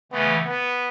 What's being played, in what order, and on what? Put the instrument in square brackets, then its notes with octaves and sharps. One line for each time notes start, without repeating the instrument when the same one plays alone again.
[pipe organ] C#3 E3 A3 [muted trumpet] B3
[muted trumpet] B3